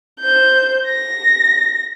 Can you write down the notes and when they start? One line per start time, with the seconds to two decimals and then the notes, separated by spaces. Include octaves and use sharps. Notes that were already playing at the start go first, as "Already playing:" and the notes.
0.20 C5 G6
0.88 A#6